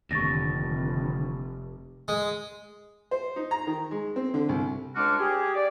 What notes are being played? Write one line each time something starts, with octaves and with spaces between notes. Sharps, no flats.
F1 D#2 D3 C#6 A6 A#6
G#3
C5
D#4
A#5
D#3
G#3
C4
D3
C2
C#2 G#3 D4 F#4 D6 F6
G4 G#4
D5